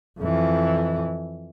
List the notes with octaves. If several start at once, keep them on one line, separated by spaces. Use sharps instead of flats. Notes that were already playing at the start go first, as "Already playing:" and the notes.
F2 E3